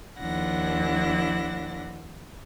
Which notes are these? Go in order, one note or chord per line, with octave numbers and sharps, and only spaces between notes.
D#2 F3 D4 E4 F#5 A#6